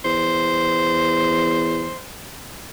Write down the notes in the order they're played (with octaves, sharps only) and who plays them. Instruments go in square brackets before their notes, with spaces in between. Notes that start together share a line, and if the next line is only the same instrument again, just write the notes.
[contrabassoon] E2 [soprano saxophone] C5